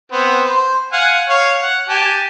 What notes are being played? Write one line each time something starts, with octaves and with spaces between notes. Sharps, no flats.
B3 C4
C5
F5 F#5 G#5
C#5 F5
F#5
G4 G#5 A5